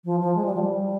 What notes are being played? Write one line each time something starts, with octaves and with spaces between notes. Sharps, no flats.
F3
F3
G#3
G3
F3
G3